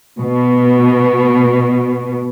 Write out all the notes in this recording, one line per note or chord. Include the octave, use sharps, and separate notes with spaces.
B2